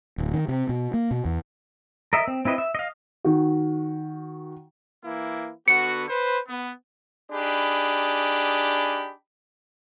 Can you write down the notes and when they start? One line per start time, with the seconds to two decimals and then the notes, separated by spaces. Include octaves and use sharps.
0.18 D1
0.34 D#3
0.48 C3
0.69 B2
0.94 A#3
1.11 B2
1.25 E2
2.13 A#4 D#5 E5
2.28 C4
2.45 C4 E4 B4 D#5
2.58 E5
2.75 D#5 F5
3.24 D#3 F#4
5.04 E3 A#3 E4
5.68 D3 B3 F#4 C#7
6.08 B4 C5
6.49 B3
7.31 D4 D#4 G4 G#4 B5